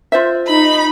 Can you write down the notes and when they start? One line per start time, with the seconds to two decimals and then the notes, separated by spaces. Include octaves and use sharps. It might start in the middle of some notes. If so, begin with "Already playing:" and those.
0.12 F4 C5 E5
0.47 D#4 B5